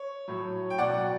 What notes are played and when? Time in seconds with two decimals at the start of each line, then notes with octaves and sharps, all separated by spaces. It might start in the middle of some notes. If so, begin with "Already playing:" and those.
Already playing: C#5
0.28 A2 F#3
0.70 G5
0.78 B2 F#3 D5 F#5